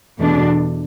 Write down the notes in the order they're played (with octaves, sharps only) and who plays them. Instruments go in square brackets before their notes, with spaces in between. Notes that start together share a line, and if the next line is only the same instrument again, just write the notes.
[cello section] E2 B2 A3 D4